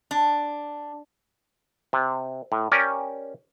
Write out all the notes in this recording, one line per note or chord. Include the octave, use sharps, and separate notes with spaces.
D4
C3
A2
C#4 G4 A#4 D5